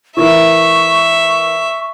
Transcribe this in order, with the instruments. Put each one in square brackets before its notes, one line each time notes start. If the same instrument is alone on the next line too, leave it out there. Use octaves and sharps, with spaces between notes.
[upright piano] E3 E4 A#4 [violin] E5 [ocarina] C#6